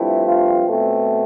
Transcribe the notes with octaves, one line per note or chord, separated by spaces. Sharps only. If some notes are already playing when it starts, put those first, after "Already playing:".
Already playing: G2 F3 A3 C4 E4
F4
B2 A3 C4